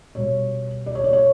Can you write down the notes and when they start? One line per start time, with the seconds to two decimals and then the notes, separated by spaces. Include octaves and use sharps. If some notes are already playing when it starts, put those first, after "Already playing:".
0.15 B2 G3 C#5
0.86 D5
0.95 C#5
1.04 D5
1.13 C#5